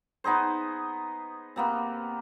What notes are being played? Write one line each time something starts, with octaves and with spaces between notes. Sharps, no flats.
B3 D#4 G#4 C5
C3 A#3 B3